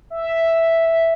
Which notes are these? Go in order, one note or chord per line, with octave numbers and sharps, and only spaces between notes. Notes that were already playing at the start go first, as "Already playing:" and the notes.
E5